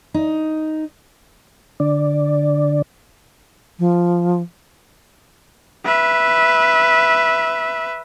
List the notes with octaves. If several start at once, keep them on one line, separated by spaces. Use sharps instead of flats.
D#4
D3 D5
F3
B4 E5